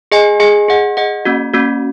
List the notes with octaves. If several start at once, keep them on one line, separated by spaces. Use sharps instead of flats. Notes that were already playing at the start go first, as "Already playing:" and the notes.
G#4 D#5 G#5
G#4 D#5 G#5
G#4 D#5 F#5
G#4 D#5 F#5
A#3 C#4 F#4
A#3 C#4 F#4